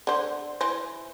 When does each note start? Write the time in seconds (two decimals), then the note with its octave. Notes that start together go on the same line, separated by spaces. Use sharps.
0.07 D3 C5
0.61 E3 C5